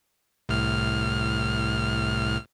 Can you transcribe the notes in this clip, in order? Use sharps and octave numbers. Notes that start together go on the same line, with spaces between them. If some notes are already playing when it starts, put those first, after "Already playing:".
C2 A2 F6